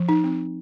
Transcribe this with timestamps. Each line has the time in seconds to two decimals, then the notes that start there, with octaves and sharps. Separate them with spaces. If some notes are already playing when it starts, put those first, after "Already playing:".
Already playing: F3
0.09 D#4
0.24 C4